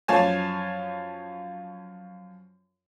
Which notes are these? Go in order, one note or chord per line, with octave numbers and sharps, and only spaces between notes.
F#2 F3 F4 C#5 G#5 A5